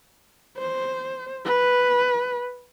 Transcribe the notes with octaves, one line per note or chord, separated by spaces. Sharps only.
C5
B4